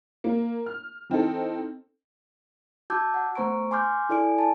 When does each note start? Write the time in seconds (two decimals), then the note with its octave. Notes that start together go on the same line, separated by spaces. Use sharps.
0.24 A#3
0.66 F6
1.10 E3 C4 D#4 A4
2.90 F#4 A5 D6 E6 G6 G#6
3.14 F#5
3.35 A3 B3 C5 A#5 C#6 D7
3.71 G#5 C6 D6 F6 G6
4.09 E4 A4 D5 G#5 D7
4.38 G#5 A5